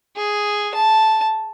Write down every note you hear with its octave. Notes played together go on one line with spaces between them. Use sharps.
G#4
A5